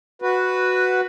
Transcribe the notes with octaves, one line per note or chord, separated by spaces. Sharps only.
F#4 B4